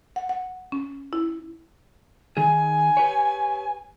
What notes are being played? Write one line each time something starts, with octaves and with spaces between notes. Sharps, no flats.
F#5
F#5
C#4
E4
D#3 G#4 G#5
G4 B4 C#5